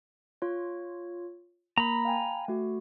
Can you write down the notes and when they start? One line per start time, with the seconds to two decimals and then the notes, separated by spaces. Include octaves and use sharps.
0.42 F4 C#5
1.78 A#3 A#5 B5
2.05 F5 G5 G#5
2.48 A3 F#4